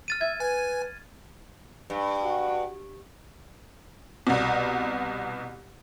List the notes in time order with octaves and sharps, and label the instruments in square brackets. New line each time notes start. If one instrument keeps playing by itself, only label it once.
[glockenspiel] F6 A6 D#7
[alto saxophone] E5 [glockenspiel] G#6
[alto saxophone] B4 [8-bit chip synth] G#5
[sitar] G2
[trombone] F#4
[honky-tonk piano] C2 B2